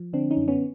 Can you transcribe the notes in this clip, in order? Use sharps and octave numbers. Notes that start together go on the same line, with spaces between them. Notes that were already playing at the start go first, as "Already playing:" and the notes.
Already playing: F3
D3 C4 D4
C#4 D#4
F#2
B3 C#4